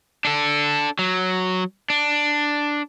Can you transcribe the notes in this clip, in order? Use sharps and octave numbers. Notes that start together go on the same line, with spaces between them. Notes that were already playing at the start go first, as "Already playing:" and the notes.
D4 A4
F#3
D4